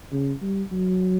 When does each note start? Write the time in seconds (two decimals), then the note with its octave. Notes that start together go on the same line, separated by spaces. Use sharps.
0.12 C#3
0.42 G3
0.72 F#3